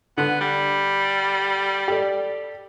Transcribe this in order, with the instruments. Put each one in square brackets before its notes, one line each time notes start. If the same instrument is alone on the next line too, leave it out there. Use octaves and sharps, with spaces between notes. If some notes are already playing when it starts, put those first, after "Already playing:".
[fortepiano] D3 [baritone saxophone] B3
[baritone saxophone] G3
[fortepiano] G4 A4 D5